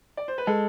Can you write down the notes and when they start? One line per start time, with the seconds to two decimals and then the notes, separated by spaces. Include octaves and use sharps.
0.17 D5
0.28 C5
0.38 B4
0.47 G#3 A4